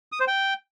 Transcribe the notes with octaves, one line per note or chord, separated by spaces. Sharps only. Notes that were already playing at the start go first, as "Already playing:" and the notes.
D#6
C5
G5